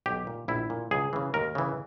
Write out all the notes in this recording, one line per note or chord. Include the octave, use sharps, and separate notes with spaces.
B1 G4
A#2
A#1 E4
A#2
C#2 G#4
C#3 E3
D#2 A#4
C#3 E3